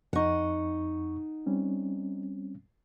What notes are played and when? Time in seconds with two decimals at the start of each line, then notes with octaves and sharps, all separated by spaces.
0.13 F2 D#4 F#5 C#6
1.46 G3 C4 C#4